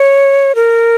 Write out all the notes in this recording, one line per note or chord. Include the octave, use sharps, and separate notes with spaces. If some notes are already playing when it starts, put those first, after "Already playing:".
Already playing: C#5
A#4